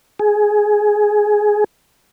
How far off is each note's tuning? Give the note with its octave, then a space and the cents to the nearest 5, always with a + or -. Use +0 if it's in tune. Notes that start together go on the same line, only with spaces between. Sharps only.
G#4 +10